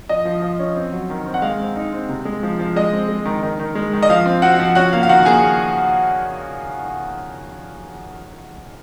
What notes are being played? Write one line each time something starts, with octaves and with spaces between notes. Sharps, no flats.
F3 D#5
F3
F3
C#4
C4
F#3
D#3
C4
F#5
G#3 F5
C4
D#4
C4
C3
G#3
F3
F3
G#3 D#5
C4
G#3
D#3
D#3
D#3
G#3
D#3
D#5
F3 F5
C4
C4 F#4 F#5
F3
C#4 F#4 F#5
A#3 F5
F5
D#3 F#4 F#5
A#3 G#4 G#5